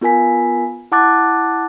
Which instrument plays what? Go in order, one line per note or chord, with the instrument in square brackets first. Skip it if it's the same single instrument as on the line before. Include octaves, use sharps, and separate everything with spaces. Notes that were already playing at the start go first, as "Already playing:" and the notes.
[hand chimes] B3 F4 A#4 G#5 B6
E4 F#5 A5 D6 F#6 A6